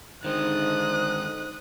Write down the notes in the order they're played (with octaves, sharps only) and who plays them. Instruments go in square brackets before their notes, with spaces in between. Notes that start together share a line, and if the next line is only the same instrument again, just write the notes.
[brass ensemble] D3 D#4 [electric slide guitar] D#3 G#3 [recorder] C5 [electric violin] D#6 F#6